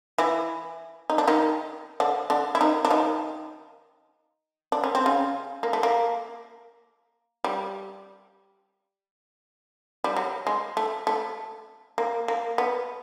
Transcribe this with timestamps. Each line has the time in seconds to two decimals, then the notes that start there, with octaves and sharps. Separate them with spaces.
0.18 E3 E4
1.10 D#4
1.18 D4
1.28 D#3 D#4
2.00 D3 D4
2.30 D3 D4
2.55 E4
2.61 D#3 D#4
2.85 D4
2.90 D#3 D#4
4.72 D4
4.84 C#4
4.95 C4
5.06 C#3 C#4
5.63 A#3
5.73 A3
5.83 A#3
7.44 G3
10.04 G3
10.16 F#3
10.47 G#3
10.77 A3
11.07 A3
11.98 A#3
12.28 A#3
12.58 B3